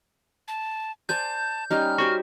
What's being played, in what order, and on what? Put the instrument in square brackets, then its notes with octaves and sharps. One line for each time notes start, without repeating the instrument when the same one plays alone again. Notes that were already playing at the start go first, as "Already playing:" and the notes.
[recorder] A5
[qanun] C5 D5 G#5 [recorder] A5 [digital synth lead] G6
[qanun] G3 C#4 D#4 [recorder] F6
[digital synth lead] F#4 [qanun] G4 C5 C#5